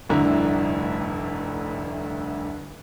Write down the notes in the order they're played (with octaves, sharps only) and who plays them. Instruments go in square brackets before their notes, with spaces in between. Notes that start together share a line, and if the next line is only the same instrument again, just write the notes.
[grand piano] F1 D2 G2 D3 E4 A#5